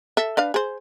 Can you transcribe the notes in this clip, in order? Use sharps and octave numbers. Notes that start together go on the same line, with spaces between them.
A4 E5
D4 B4 F5
G#4 C5